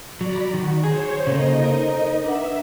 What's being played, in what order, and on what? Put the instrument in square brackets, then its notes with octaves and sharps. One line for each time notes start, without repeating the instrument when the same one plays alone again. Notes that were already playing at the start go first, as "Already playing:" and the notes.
[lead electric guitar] F#3 [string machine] D5 A#5 B5
[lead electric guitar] D#3 [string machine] F#4
[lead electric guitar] G#4 [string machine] C5 C#5
[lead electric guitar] C#3 A#3 [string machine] D#4 D#5 [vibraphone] A4 C5
[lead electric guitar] A#4
[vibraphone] D4 B4 F#5 [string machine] E5